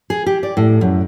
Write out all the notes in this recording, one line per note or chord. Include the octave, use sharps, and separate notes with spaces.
G#4
G4
D5
A2
F#2